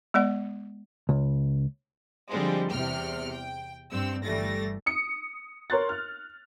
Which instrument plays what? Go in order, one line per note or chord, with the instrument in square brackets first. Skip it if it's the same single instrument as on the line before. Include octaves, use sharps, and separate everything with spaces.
[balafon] G#3 B3 D5 F#5
[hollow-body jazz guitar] C#2
[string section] D3 F3 G3 G#3 C4
E2 C3 G5 F6
G5
G2 C4 E6
G1 E3 G3 A3 A6 A#6
[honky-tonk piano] D#6 C#7
A#4 C#5 C6 F#6 A6
F6